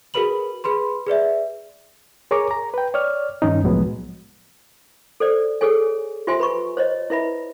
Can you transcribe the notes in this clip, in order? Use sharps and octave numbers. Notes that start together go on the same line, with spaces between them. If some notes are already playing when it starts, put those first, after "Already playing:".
F#4 G#4 A#4 B4 B5 F#7
G#4 B4 B5 C6
G#4 B4 D5 E5
G#4 A#4 C#5 A#5 C#6 D6
A#5
B4 G5
C#5 D5 F6
G2 D#3 C#4 D#4
C2 A2 F3 F#3 G#3 B3
A4 C5 D5
G#4 A4 C#5 G#5
F4 G4 C5 E5 G#5 C6
B4 B5 C#6
C5 C#5 D#5
E4 B4 E5 B5